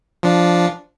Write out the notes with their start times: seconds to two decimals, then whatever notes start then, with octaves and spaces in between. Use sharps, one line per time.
0.23 F3 D4